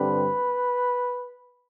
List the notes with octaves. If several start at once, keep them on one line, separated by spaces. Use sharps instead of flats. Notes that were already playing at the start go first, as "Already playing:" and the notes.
Already playing: G2 D3 G3 C4 B4